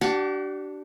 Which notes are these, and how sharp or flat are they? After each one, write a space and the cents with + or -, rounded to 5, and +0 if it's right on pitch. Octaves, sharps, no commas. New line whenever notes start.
D4 +0 G4 -40 F#5 +0